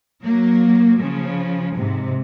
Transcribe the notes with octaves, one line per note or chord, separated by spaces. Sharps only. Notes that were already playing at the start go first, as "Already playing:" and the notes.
F#3 A#3
C#3 F3
G#2 C3